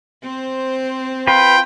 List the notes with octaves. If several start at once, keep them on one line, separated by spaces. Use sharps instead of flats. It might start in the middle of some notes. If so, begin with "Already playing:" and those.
C4 C5
F4 B4 G5